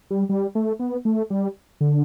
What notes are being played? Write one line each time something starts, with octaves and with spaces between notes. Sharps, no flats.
G3
G3
A3
B3
A3
G3
D3